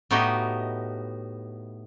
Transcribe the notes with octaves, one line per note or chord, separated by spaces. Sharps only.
A2 B3 D#4 F#4 G4 D#5